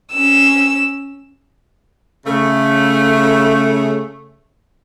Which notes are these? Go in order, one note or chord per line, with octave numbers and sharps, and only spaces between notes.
C#4 E6
C#3 A3